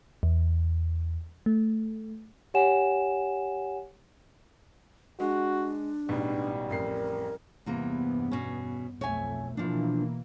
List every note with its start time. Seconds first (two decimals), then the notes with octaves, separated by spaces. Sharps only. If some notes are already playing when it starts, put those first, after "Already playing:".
0.23 E2
1.46 A3
2.54 G4 C#5 F#5 G#5 E7
5.20 G#3 D4 F#4
6.09 A1 G#2 B2 G3
6.71 A1 F2 A#4 C7
7.66 E2 G2 C3 E3 A#3 B3
8.31 B2 C#4
9.01 B1 F2 A3 C#5 E5 G#5
9.57 B2 E3 F3 A#3 D4